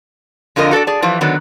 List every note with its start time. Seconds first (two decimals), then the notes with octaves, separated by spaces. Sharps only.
0.56 F2 D3 F4 A#4 D#5
0.71 F#4 A4 A#4 D5
0.87 G#4 D5 A5
1.02 E3 F3 G3
1.21 D3 D#3 F#3 B3